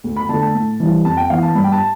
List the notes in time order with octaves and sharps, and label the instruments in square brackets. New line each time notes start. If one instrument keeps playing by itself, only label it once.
[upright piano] D2
B5
D3 A5
A3
A5
A2
E3 G3
F2 A5
G5
E3 B3 F5
A5
G2 B5
G5
A5